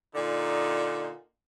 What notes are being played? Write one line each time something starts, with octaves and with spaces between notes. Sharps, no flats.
A#2 D3 D#4